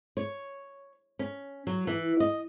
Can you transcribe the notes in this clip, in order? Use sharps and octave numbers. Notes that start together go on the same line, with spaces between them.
C#5
C#4
F#3
E3
D#5